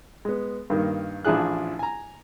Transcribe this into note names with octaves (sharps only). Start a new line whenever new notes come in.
G#3 B3
G2 D#3 A#3
A1 F3 D4 E4 G#4 F#6
G#5 A#5